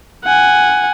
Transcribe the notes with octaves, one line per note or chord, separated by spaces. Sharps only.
F#5 G#5